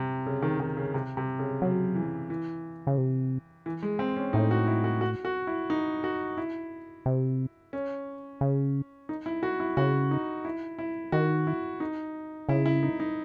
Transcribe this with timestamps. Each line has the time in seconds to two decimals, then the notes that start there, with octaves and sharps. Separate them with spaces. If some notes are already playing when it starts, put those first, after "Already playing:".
Already playing: C3
0.27 C#3
0.42 D#3
0.60 D#3
0.77 C#3
0.94 C3
1.17 C3
1.39 C#3
1.62 C#3 F#3
1.95 E3
2.30 E3
2.87 C#3
2.98 C3
3.66 E3
3.83 G#3
3.99 C4
4.17 C#4
4.33 A2 D#4
4.51 F#4
4.67 E4
4.84 F#4
5.01 F#4
5.25 F#4
5.47 E4
5.70 D#4
6.04 F#4
6.37 E4
7.06 C3
7.73 C#4
8.41 C#3
9.09 D#4
9.26 E4
9.43 F#4
9.60 E4
9.77 C#3 F#4
10.11 D#4
10.45 E4
10.79 E4
11.12 D#3 F#4
11.47 E4
11.80 D#4
12.49 C#3 E4
12.66 E4
12.83 D#4
13.00 D#4